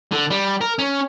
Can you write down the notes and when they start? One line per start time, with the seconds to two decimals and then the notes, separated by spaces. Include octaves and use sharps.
0.12 D3
0.30 G3
0.61 A#4
0.79 C#4